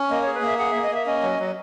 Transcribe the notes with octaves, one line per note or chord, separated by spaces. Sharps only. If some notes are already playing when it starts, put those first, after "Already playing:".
Already playing: C#4
A#3 D#5
G#4 C#5
B4
A#3 E5
G#4 F#5
A#3 E5
D#5
A#3 E5
C#4 D#5
F#3
F#3